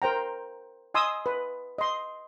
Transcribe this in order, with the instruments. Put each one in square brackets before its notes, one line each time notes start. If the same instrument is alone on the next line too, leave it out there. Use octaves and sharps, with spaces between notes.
[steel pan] A#4 C5 G5 A#5
D#5 G#5 C6 D#6 E6
B4
D#5 C6